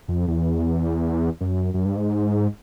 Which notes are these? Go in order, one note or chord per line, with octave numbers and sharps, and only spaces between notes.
F2
E2
F#2
F#2
G2
G#2